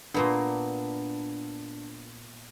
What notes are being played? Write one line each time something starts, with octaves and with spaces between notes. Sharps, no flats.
A#2 A#3 B3 D4